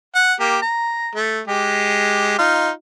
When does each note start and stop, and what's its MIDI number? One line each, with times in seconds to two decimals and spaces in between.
0.15 0.34 78
0.40 0.58 58
0.40 0.58 67
0.62 1.12 82
1.15 1.40 57
1.48 2.37 56
1.48 2.37 67
2.38 2.70 63
2.38 2.70 65